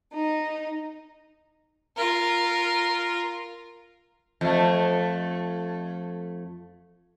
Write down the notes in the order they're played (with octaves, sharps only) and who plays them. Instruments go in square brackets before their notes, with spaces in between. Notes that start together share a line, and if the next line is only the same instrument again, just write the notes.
[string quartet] D#4
[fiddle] F4 A#4
[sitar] F2 A3